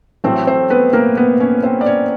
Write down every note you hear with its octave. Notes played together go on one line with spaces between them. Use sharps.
A1 A2 F#3 A3 C4 C5
C4 C5
B3 B4
A#3 A#4
B3 B4
C#4 C#5
C4 C5
D5
C#4 C#5